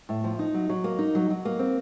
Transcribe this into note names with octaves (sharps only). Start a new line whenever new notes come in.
A2
F3
D#4
F#3
F#3
A#3
D#4
F#3
F#3
A#3
C4